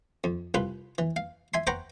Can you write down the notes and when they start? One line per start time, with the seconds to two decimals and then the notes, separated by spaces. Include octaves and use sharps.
0.24 F2
0.54 C2 F4 B4
0.98 E3
1.16 F5
1.54 E5 G#5 C6
1.67 B4 C5 F#5 G5 A#5 C#6